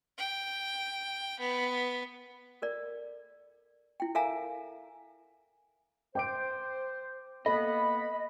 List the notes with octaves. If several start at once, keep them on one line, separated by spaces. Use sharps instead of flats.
G5
B3
A4 A#4 D5
E4 G5
A4 A#4 E5 F5 G#5 A#5
C5 G5 D6 D7
A#3 B3 A4 D#5 B5